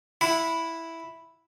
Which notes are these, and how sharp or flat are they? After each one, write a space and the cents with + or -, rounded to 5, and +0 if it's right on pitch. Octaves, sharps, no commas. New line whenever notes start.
E4 +0 F#5 -30 B5 +0